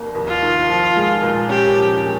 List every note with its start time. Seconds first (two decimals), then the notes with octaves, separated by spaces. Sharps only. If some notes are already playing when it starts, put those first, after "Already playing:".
Already playing: F1 D#2 A#3
0.15 D#2
0.28 F4
0.42 D#3
0.69 F3
0.96 G#3
1.22 A#2
1.49 C#4 G4
1.76 F3
2.03 G#3